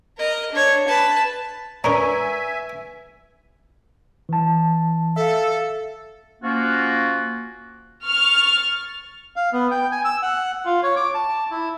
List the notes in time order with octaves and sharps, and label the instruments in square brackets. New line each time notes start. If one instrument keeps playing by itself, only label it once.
[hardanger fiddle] A#4 D#5
D4 C#5
B4 A5
[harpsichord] C#4 D4 A#4 [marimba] B4 C#6 [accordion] E5 G#5 [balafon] A#5
[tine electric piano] E3 A5
[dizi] A4 [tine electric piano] E5 F5
[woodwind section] F3 A#3 C#4 F4 F#4
[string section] C#6 F6 A6
[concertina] F5
B3
G5
G#5
E6
F#5
F4
C#5
D6
A5
E4